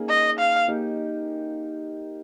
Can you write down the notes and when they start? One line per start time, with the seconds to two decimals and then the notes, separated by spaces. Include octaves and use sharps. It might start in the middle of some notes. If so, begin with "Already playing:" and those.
Already playing: A#3 C#4 D#4 G#4
0.09 D#5
0.39 F5
0.68 A#3 D#4 G4